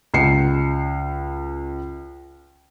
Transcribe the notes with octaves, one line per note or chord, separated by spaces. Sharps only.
C#2 C7 C#7